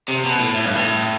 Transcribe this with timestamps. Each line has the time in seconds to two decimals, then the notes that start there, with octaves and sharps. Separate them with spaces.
0.08 C3
0.24 B2
0.39 A2
0.54 A2
0.65 G2
0.75 A2